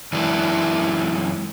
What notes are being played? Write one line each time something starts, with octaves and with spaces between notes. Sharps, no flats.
F#2 E3 G#3 D4 E4